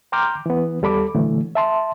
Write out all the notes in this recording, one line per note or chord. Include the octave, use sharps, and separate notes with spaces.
G5 A#5 C6 D6 F6 G6
E3 B3
D#2 G3 A4 B5 D6
A#2 D3 E3 F#3 A3
E5 A5 C6